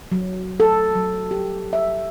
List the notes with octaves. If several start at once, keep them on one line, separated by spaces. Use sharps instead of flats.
F#3
A4
F#3
G4
E5